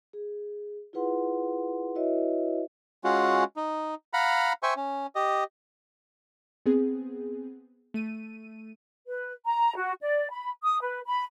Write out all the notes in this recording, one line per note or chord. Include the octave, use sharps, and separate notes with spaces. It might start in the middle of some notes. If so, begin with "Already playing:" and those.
G#4
E4 F4 G#4 B4 F#5 C6
E4 F#4 B4 C#5 D#5 E5
G#3 C#4 F4 F#4
D#4
F5 F#5 A#5 B5
C5 E5 G5 G#5 C#6
C#4
G4 D#5
B3 C4 G#4
A3 D#7
B4
A#5
F#4
D5
B5
D#6
B4
B5